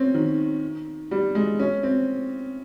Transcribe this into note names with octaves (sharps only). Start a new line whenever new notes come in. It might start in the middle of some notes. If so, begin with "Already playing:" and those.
Already playing: C4 C#4
D#3
G3
G#3
C#4
C4